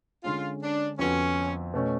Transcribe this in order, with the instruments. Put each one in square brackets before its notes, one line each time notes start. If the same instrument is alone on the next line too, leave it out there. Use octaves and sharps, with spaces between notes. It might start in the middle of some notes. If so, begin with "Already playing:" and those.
[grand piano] D3 G#3 C#4 [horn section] F4
[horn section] D4
[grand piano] F2 F3 B3 F#4 [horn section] C#4
[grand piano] B2 A3 C#4